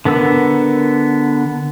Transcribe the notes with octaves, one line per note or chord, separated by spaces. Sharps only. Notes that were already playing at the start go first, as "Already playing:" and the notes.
D3 B3 A#4 E6